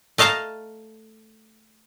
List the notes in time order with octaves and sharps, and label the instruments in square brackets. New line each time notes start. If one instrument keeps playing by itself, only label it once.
[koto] A3 D#5 F5 A5 A#5